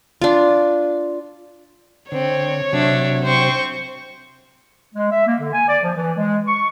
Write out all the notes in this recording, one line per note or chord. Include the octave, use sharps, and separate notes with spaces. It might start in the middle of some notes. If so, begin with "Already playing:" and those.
D4 F4
D3 C4 C#5
C3 F#3 D4 E5
C4 C5 C#6
G#3
E5
A#3
D3
G#5
D5
F3
E3
G#3
C#6